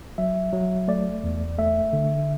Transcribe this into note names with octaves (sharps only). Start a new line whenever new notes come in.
F#3 E5
F#3
A3 D5
E2
A3 E5
D3